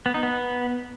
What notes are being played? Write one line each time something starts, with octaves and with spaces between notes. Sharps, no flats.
B3
D#4
B3